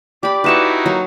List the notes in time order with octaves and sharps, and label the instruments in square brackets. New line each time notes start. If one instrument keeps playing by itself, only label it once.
[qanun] G4 B5 [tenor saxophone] D5
[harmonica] D#4 E4 F#4 [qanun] B4 A5 C#6
[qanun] F#3 [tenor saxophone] A#3